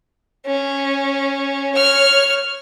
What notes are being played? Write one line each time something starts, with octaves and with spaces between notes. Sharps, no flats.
C#4
C#5 F6